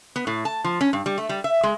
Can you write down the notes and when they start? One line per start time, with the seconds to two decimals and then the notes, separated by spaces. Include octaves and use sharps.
0.16 B3
0.27 A2
0.45 A5
0.64 F3
0.81 C#4
0.93 G2
1.06 G3
1.18 A3
1.29 G3
1.44 E5
1.63 G#3